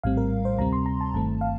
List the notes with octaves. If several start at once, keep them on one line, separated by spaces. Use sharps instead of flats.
A#1 A2 G3 C4 F5
A#4
C5
D2 C3 G3 C4 A#5
C6
A#5
A5
G1 G2 D#3 A3 C4 A5
F5